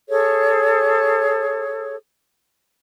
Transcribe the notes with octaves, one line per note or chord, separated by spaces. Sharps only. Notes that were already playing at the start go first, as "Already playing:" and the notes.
G#4 A4 C#5